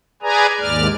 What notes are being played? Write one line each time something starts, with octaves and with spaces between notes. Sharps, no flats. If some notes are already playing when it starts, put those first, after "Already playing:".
G#4 B4 D5 G#5 A#5
D#2 G#2 D5 F6